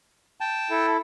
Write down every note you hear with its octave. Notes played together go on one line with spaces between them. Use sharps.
G5 A5
E4 A4